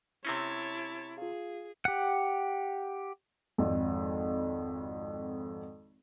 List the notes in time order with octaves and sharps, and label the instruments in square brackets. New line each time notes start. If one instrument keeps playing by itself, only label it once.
[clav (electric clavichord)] C3 C4 C#4 [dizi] E4 [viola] C#5 A5
[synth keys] F4 F5 [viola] G#4
[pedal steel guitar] G4 F#5
[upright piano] G#1 F2